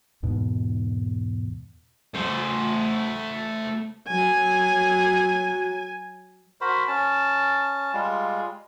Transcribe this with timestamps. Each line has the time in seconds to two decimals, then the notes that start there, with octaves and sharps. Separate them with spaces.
0.23 E2 G#2 B2
2.14 A3 C5
4.08 F#3 G#5
6.61 F#4 A#4 C5 B5
6.88 C#4 A5
7.93 G3 G#3 F4